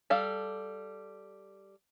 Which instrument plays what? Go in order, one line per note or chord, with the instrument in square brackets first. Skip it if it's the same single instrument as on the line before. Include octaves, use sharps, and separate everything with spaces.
[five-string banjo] G3 A4 F5